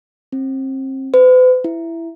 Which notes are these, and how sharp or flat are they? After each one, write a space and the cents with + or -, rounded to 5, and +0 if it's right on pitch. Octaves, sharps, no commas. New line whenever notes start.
C4 +30
B4 +45
E4 +10